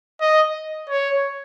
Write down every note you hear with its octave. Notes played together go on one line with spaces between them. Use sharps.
D#5
C#5